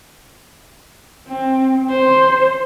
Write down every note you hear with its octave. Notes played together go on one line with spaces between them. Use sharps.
C4
C5